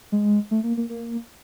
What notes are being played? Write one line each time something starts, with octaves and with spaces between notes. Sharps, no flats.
G#3
A3
A#3
A#3
A#3